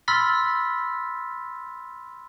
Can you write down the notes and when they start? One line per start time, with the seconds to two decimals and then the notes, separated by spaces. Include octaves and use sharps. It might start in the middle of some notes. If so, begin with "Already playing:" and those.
0.08 B5 C6 E6 F6 A6 B6